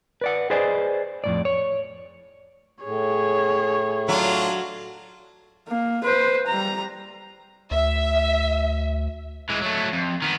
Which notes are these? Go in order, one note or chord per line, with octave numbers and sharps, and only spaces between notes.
B4 D5 F#5
G#4 B4 C5 D5 D#5 G#5
F2 A2 D5
C#5
A2 G#4 C#5
F#3 D4 F4
A#3
B4 C5
G3 A#5
D2 E5
E3 G#3
F#3 A3
F2
D#3 B3